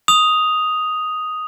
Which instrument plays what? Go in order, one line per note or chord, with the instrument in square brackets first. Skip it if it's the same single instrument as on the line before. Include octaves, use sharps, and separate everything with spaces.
[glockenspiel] D#6 F7